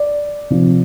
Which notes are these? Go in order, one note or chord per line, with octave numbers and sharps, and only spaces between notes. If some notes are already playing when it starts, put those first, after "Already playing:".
Already playing: D5
C3 F3